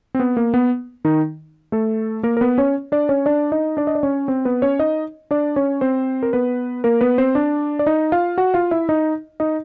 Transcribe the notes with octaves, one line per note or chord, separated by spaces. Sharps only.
C4
B3
A#3
B3
D#3 D#4
A3 A4
A#3 A#4
A#4
B3 B4
C#4 C#5
D4 D5
C#4 C#5
D4 D5
D#4 D#5
D4 D5
D#5
D5
C#4 C#5
C4 C5
B3 B4
C#4 C#5
D#4 D#5
D4 D5
C#4 C#5
C4 C5
A#4
B3 B4
A#3 A#4
B3 B4
C4 C5
D4 D5
D5
D#4 D#5
F4 F5
F#4 F#5
F4 F5
E4 E5
D#4 D#5
D#4 D#5